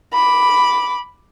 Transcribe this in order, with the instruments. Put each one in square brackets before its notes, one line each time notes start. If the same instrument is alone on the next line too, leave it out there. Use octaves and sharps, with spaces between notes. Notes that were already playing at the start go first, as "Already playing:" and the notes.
[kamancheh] B5 D6